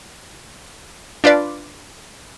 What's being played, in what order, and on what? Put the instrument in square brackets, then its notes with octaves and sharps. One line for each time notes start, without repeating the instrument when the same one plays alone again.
[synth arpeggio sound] D4 F4 B4 D5